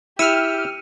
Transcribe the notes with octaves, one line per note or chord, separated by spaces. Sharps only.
E4 G4 E6 F6 C#7 D#7